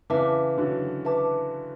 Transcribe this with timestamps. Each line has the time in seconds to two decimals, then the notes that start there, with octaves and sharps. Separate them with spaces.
0.10 C#3 E3 B4 E5 A5 D6
0.58 D3 F#3
1.05 B4 E5 A5 D6